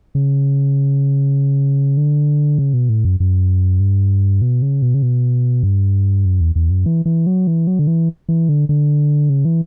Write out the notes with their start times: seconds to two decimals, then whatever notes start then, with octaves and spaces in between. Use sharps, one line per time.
0.15 C#3
1.97 D3
2.58 C#3
2.73 B2
2.89 A2
3.05 F#2
3.20 F#2
3.80 G2
4.42 B2
4.62 C#3
4.82 B2
4.94 C#3
5.03 B2
5.63 G2
6.25 F#2
6.41 E2
6.55 E2
6.70 F#2
6.86 E3
7.06 E3
7.27 F#3
7.47 E3
7.67 F#3
7.79 D3
7.87 E3
8.29 E3
8.49 D3
8.69 D3
9.30 C#3
9.45 E3